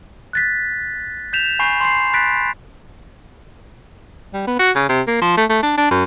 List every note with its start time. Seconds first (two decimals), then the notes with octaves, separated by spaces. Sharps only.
0.33 F#6 A6 B6
1.33 G6 B6 E7 F7
1.59 G#5 B5 C#6 G6 C7
1.80 C6 C7
2.13 B5 F#6 A6 B6 D7
4.33 G3
4.47 B3
4.59 F#4
4.75 C#3
4.89 C3
5.07 A#3
5.21 F3
5.37 A3
5.49 A3
5.63 D4
5.77 D4
5.91 F#2